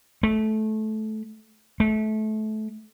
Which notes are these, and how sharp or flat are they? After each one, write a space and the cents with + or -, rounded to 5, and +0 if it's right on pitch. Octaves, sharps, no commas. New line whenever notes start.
A3 -20
A3 -25